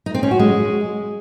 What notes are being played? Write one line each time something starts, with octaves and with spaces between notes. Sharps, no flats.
D#4
C4
C#4
F#4
G#3